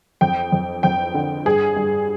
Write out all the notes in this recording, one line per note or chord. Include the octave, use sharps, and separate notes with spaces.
F2 G5
F2
F2 G5
D3
G2 G#4
G2